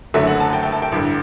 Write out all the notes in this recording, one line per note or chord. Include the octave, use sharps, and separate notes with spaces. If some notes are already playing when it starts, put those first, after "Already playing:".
F#1 F#2 D3 F#3 A3 E5
F#5
A5
G5
G5
A5
G5
A1 G2 D3